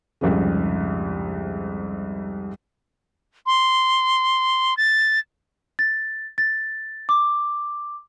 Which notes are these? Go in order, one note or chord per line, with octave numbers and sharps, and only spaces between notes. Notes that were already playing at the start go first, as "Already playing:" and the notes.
C2 F2 G#2 C#3
C6
A6
A6
A6
D6